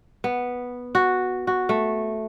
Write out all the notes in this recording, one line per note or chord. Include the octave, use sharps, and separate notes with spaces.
B3
F#4
F#4
A3